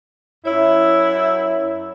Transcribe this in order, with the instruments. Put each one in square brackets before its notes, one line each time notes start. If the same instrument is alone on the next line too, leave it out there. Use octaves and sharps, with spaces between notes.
[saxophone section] F#2 E4 [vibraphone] C#5